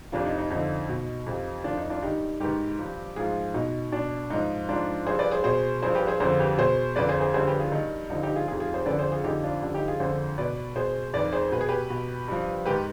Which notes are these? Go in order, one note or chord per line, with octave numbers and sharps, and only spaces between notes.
F2 C3 F3 D4 F4
D#4
D#4
F2 D3 F3 D#4
B2
F2 C3 F3
F2 D#3 D4 F4
D#4
D4 F4
G2 D#3 D#4 G4
G#2 D#3 G4 B4
G2 F3
G#2 F3 F4 G#4
B2 D#4
B2 D4
G#2 F3 D#4
G#2 F3 D4 F4
G2 F3 G#4 C5
B4 D5
G#4 C5
B2 G#4 C5
G2 F3 G#4 C5
G4 B4
G#4 C5
F2 D3 F3 G#4 C5
G4 B4
B2 G#4 C5
F2 D3 F3 B4 D5
G#4 C5
G#4 C5
G2 D3 F3 G#4 C5
G4 B4
F4 G#4
G2 D#3 D#4
G2 D3 F3 D#4
D#4 G4
F4 G#4
F2 C3 D#3 F4 G#4
F4 G#4
G#4 C5
F2 D3 F3 B4 D5
G#4 C5
F4 G#4
F2 D3 F3 D#4 G4
D4 F4
G2 D3 F3
D#4 G4
F4 G#4
F2 D3 F3 G#4 C5
B2 B4 D5
B2 G#4 C5
F2 D#3 B4 D5
G#4 C5
B2 B4
G#4
G4 B4
B2
G2 F3
G#2 D#3 G4 B4